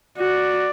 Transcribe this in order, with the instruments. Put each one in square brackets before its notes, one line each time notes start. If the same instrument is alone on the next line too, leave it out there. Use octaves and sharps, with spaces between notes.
[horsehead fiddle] F#4 [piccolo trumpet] D5